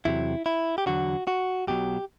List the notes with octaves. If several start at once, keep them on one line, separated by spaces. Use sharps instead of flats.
E2 C3 F#3 E4
E4
G4
E2 D3 F#3 F#4
F#4
B1 B2 F#3 G4